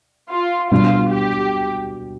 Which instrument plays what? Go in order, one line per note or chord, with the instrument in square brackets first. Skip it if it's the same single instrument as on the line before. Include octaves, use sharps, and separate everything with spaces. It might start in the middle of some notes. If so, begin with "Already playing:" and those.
[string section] F4
[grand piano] B2 G3 D4 [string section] F4
[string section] G4